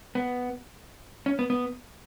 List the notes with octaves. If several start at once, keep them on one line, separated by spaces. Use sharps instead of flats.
B3
C#4
B3
B3